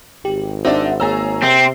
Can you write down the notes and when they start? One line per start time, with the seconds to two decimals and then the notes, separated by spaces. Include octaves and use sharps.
0.25 G#1 G4
0.65 D4 D#4 C5 E5 F#5
1.00 A#3 G#4 C#5 A#5 E6
1.42 C3 C4